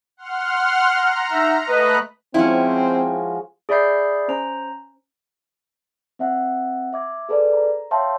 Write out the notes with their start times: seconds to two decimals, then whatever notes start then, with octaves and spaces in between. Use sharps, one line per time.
0.17 F#5 C6 F6
0.90 A#5
1.31 D#4 E5
1.67 A3 B4 D#5 B5 F#6
2.34 F3 G#3 C4 C#4 E4 F#4 G5
3.69 G#4 D5 E5 B5 G6 C7
4.28 C#4 C5 A#5
6.19 C4 E5 F#5
6.93 E5 D6 G#6
7.29 G#4 A4 B4 D5
7.53 A#5
7.91 C#5 E5 F5 G5 A5 C6